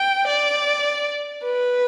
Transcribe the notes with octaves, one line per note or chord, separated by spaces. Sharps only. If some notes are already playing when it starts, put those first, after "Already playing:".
Already playing: G5
D5
B4